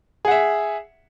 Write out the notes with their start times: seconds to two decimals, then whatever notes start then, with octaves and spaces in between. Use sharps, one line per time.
0.25 G#4
0.28 F#5
0.31 E5